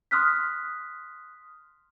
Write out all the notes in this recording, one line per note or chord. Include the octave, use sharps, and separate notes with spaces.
C6 D#6 F6 F#6 B6